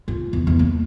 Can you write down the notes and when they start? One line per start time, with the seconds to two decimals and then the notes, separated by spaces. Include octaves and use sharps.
0.08 F4
0.33 E2
0.47 E2
0.59 A#3